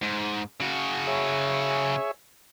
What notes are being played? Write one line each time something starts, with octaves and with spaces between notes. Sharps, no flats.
G#2
C#3 F#4
G#4 C#5 E5